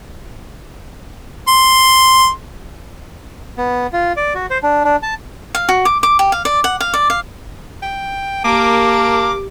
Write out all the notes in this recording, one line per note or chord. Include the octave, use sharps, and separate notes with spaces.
C6
B3
F4
D5
F#4
C5
D4
D4
A5
F5
F#4
D6
D6
G4
F5
D5
F#5
F5
D5
F5
G5
A#3 G4 A#4 A5 D6